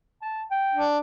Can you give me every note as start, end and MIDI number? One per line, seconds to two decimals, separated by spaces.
0.22 0.42 81
0.51 0.85 79
0.74 0.99 62